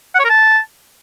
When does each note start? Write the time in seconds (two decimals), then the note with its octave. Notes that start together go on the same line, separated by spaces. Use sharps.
0.15 F#5
0.20 C#5
0.25 A#4
0.30 A5